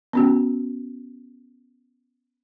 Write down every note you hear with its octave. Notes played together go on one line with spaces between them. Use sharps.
B3 C#4 F#4